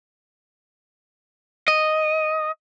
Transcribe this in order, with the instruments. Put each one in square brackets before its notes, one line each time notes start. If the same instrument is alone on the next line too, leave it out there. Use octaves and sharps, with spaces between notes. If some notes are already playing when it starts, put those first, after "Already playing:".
[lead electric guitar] D#5